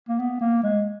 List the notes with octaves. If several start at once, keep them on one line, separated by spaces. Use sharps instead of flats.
A#3
B3
A#3
G#3